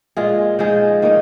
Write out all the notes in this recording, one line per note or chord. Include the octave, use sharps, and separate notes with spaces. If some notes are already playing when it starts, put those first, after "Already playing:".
A#2 G#3 F4 G#4
F3 G#3 D#4 G#4
D#3 A#3 D#4